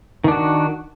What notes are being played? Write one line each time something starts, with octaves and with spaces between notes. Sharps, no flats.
D#3 D4 F#4